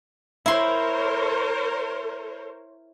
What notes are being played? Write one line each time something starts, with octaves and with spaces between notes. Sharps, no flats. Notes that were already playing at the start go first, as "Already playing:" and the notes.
E4 A#4 C5 C#5 C6